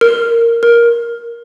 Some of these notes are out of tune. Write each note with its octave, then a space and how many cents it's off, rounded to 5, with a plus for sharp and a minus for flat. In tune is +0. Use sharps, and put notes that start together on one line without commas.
A#4 -10
A#4 +10